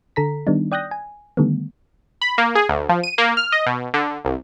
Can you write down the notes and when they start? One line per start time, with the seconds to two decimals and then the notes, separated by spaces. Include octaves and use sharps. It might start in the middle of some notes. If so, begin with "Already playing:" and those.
0.16 D3 A4 A#5 B6
0.47 D#3 G3 B3 D4 D#4
0.72 D5 G5 D#6 F#6 G6 A#6
0.91 G#5
1.37 D3 D#3 G3 A3 B3
2.22 B5
2.38 A#3
2.55 G#4
2.69 D2
2.89 F3
3.03 D#7
3.18 A#3
3.37 F6
3.52 D#5
3.66 B2
3.94 D3
4.25 C2